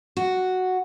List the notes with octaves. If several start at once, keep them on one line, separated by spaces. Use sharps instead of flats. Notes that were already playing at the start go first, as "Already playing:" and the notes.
F#4